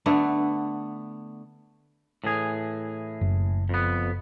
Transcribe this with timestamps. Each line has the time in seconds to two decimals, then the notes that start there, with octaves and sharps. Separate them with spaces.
0.06 D3 A3 B3
2.24 A2 E3 G#4
3.21 F#1
3.69 F2 B3